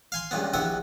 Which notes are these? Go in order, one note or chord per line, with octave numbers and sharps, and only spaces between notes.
F5 G#5 C6
C#2 G2 A#2 B3
A#1 G2 E3 B3 E5 F#5